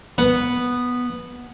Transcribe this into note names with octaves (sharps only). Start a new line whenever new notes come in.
B3